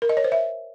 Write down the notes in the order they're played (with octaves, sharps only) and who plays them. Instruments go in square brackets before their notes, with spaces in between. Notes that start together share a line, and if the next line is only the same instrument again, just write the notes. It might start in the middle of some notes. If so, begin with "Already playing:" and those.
[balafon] A#4
D#5
C#5
C5
E5